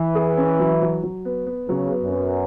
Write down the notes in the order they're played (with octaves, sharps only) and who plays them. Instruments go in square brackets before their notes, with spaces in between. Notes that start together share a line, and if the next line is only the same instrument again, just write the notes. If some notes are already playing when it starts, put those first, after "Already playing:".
Already playing: [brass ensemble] E3
[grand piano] G#4
C#4
F#3
F#3
F#3
B3
B3
[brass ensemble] C#3 [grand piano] F#3
[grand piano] B3
[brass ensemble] F#2
[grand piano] B3